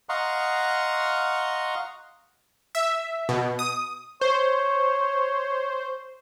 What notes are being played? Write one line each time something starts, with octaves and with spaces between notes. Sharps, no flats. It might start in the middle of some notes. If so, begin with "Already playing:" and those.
D#5 F5 F#5 A#5 C6 C#6
E5
B2
D#6
C5 C#5